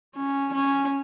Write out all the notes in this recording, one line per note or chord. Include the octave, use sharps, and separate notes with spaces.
C#4
C#4